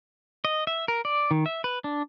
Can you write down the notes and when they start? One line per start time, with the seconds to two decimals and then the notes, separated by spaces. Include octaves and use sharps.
0.45 D#5
0.67 E5
0.88 A#4
1.05 D5
1.31 D#3
1.46 E5
1.64 B4
1.84 D4